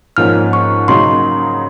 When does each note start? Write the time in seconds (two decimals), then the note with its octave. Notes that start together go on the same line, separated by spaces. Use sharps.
0.17 G#2 F3 A#3 C#4 F6
0.53 C#6
0.88 C#3 F#3 A#3 D#4 A#4 C6